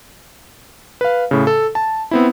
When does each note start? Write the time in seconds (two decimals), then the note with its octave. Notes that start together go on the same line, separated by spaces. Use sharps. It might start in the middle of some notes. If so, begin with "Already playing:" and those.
1.01 B4 F5
1.31 A2 C#3
1.47 A4
1.75 A5
2.11 B3 C4 E4